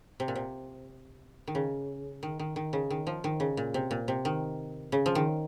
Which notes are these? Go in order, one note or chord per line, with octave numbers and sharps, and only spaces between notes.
C3
A#2
C3
D#3
C#3
D#3
D#3
D#3
C#3
D#3
F3
D#3
C#3
A#2
C3
A#2
C3
D#3
C#3
F3
D#3